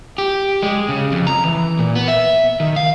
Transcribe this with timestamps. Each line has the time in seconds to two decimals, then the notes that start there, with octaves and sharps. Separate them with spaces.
0.18 G4
0.63 G#3
0.89 C#3
1.12 F2
1.27 A#5
1.44 E3
1.79 A#2
1.95 B3
2.08 E5
2.60 D#3
2.76 F5